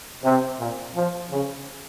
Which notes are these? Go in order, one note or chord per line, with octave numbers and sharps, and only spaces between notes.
C3
A#2
F3
C#3